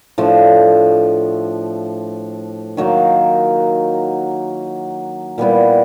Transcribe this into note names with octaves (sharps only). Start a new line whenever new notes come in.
A2 F3 A3 D4
D#3 F#3 A#3 D#4
A#2 G3 B3 E4